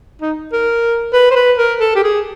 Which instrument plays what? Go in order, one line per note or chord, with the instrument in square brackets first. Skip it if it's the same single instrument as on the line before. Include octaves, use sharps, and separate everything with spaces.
[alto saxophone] D#4
A#4
B4
C5
B4
A#4
A4
G4
G#4